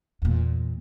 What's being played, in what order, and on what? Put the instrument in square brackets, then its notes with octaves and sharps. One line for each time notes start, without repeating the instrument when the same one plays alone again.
[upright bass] E2 A#2